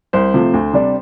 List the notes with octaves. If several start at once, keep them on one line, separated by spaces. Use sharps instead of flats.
C2 C5
C3 F3 A3
D2
C3 G3 D4